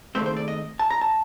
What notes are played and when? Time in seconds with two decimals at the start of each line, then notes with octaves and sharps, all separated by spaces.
0.15 D#2 C#3 F#3 A3 C4 C5
0.26 C5
0.37 D5
0.48 D#5
0.79 A5
0.90 A#5
1.01 A5